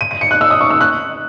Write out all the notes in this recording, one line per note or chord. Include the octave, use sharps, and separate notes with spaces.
D#7
D#7
C#7
F#6
E6
D#6
C#6
E6
F#6